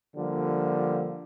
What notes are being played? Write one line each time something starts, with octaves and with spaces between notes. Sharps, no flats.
D3 F3 G3 A#3